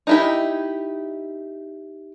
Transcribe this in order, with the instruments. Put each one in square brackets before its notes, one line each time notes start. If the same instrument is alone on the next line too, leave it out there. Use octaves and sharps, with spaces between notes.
[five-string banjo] D#4 E4 G4